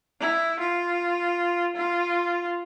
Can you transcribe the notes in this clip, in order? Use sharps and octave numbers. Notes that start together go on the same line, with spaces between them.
E4
F4
F4